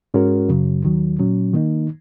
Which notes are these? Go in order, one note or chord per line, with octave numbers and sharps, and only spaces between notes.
G#2 G#3 C#4 F#4 A#4
F#2 C#3 F#3
D#2 D#3 F#3
A#2 F#3 C#4
D#3 A#3 D#4